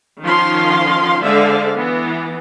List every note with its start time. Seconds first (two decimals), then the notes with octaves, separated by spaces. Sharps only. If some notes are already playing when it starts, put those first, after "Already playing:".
0.24 D#3 F3 C#4 F5 C6
1.23 D3 G#3 C5 D5 E5 F5
1.76 E3 B3